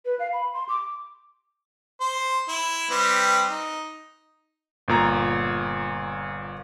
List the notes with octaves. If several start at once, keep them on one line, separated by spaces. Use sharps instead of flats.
B4
F5
B5
C6
D6
C5
E4
G3 C4 B4
D#4
G1 A#2 A#5